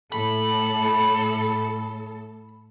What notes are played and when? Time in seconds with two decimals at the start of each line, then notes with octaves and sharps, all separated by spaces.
0.12 A2 A4 B5